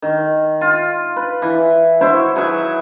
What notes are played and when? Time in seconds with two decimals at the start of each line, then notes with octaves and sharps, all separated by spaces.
0.02 D#3
0.61 F4
1.16 B4
1.42 E3
2.01 E4 F#4 C5 C#5
2.36 F#3 G#4 B4 E5